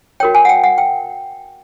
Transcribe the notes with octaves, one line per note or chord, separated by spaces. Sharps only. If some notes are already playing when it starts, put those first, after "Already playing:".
F#4 A#4 C#5 G5
G#5
F#5
G5
F#5
G5